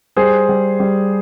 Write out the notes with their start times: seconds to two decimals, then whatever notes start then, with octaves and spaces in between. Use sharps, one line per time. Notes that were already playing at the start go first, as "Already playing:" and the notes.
0.16 G3 G#4 C5
0.49 G3
0.80 G3